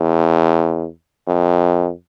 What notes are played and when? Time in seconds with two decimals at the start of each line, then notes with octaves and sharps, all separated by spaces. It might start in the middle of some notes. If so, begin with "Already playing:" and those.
Already playing: E2
1.27 F2